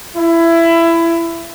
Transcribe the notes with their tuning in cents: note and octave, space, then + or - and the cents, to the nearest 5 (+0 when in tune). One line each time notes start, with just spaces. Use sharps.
E4 +20